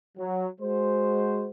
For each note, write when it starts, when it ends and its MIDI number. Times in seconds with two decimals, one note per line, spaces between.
0.18 0.48 54
0.61 1.49 56
0.61 1.49 66
0.61 1.49 72